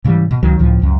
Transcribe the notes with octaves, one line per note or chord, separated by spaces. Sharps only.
G#2 C#3 E3 G3
B2
C#2 D#3 F#3
C#2 A2 F3
C#2 F#2